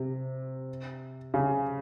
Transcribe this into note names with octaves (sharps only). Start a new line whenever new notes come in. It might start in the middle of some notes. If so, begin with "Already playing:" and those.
Already playing: C3
C#3